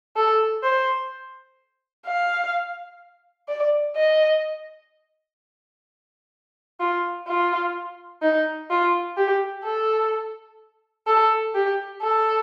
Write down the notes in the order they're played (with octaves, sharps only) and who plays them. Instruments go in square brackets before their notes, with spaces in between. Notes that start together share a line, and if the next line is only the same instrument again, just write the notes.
[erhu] A4
C5
F5
D5
D#5
F4
F4
D#4
F4
G4
A4
A4
G4
A4